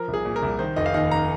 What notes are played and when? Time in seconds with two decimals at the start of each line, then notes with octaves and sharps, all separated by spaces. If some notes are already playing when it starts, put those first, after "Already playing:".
Already playing: F3 A#4
0.08 C2
0.14 G#4
0.25 A#2
0.36 A#4
0.42 C2
0.59 D#3 C5
0.76 F1 D#5
0.86 F5
0.94 D#2 D#5
1.11 A#5